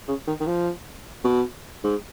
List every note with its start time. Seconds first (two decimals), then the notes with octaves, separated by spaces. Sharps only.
0.08 C#3
0.27 D#3
0.40 D#3
0.47 F3
1.24 B2
1.84 G#2